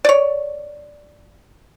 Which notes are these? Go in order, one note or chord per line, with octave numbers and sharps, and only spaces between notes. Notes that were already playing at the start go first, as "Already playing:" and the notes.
C#5 D5